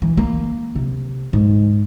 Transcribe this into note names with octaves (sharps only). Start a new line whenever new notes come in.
E3
A#3
C3
G#2